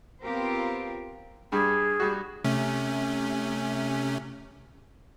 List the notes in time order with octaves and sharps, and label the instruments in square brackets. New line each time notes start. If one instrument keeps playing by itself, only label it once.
[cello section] B3 C4 F4 G4 A#4 C5
[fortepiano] G2 G3 [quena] G#4
[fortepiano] G3 F#4
[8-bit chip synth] C3 A3 C#4